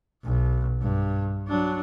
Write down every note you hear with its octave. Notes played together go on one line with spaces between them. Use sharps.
B1
G2
F#3 D4